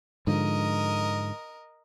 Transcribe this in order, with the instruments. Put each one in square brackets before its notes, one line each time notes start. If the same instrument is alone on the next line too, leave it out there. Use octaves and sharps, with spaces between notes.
[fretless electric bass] G#2 D3 F3 [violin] A#4 D#5